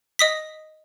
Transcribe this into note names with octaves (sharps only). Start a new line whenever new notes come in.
D#5 D#6 B6